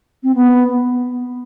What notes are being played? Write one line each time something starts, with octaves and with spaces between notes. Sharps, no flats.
C4
B3